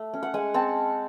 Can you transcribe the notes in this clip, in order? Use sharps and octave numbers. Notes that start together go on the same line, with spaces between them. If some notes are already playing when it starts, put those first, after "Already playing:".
Already playing: A3
C#4
F#5
G#3 G#5
C4 A5